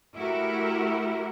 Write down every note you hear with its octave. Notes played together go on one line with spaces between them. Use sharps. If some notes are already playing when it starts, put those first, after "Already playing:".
A3 E4 F#4 G4 A#4 E5